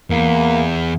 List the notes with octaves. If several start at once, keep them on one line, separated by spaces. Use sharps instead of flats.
E2 A#3